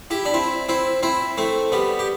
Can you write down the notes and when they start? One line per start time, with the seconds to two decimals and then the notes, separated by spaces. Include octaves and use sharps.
0.10 E4 G4
0.25 D4
0.34 C4 E4
0.69 C4 E4
1.03 C4 E4
1.38 A3 C4
1.72 G3 B3
1.99 G4